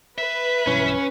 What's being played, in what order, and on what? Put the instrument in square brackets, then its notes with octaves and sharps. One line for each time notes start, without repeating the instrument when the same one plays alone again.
[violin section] B4 [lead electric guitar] E5
[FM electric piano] B1 G2 E3 [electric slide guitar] C#4